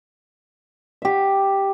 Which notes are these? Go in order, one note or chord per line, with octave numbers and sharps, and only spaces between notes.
G4 E5